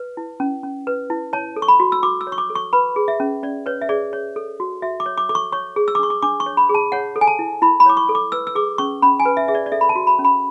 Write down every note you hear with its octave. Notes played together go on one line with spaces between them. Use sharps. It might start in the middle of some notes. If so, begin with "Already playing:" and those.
Already playing: B4
E4
C#4
C#4
B4
E4
C#5 A5
A4
C#6
B5
F#4
E6
F#4 D6
E6
C#5
C#6
D6
A4
C#6
B4 B5
G#4
E5
C#4
C#4 D5
B4 C#5
E5
G#4 D5
C#5
A4
F#4
F#4 E5
D6
C#5
D6
A4 D6
C#6
C#5 C#6
G#4
E6
D6
D4 C#6
D6
D4 D6
C#6
C#5
B5
G#4
A5
C#5 F#5
A4
G#5
A5
E4
E4 B5
B5
C#5 D6
C#6
A4
D6
B4 E6
E6
G#4 D6
C#4 C#6
C#4 B5
G#5
B4
E5
G#4 E5
D5
D5
A4 E5
B5
A5
F#4
B5
C#4
B5